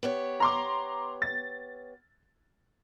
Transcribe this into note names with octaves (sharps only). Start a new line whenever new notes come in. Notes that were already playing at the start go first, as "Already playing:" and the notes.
B3 G4 C#5
A#5 C6 D6
A6